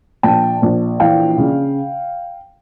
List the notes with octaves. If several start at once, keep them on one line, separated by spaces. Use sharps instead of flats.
A#1 G5 A5
A#1
E3 F5 G5
C#3